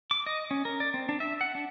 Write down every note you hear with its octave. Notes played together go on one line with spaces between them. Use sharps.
D6
D#5
C#4
A#4
D5
C4
D4
E5
F#5
D4